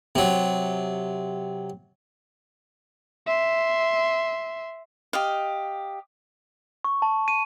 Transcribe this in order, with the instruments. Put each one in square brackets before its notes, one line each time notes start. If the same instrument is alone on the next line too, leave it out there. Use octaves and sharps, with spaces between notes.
[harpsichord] C3 F#3
[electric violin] E5 C6
[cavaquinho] G4 D#5 F5
[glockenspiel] C#6
A5
D#7